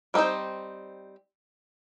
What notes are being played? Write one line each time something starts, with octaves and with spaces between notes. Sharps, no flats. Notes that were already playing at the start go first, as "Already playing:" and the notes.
G3 A#3 C4 D#4 C5